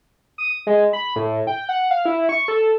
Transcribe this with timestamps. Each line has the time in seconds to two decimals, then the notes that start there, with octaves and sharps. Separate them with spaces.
0.38 D#6
0.67 G#3
0.93 B5
1.16 A2
1.47 G5
1.69 F#5
1.91 F5
2.05 E4
2.29 C#6
2.48 A4